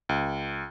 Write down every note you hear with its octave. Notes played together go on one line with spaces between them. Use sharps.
C#2